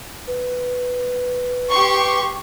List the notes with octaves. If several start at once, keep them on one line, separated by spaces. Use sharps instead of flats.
B4
G4 C6 C#6